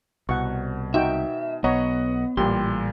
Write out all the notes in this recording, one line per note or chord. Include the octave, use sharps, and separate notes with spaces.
C2 B2 F#5 C#6
D#4 F#4 E5 G5
B1 B3 C#5 D#5 F#5 A#5
A1 A#2 G3 G4 C6